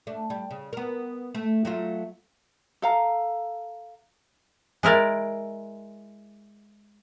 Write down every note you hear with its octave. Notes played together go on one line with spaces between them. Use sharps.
A3 D4
G3
C#3
B3 A#4
A3
F#3 A3 F4
A4 F5 A#5
G#3 E4 A#4 D5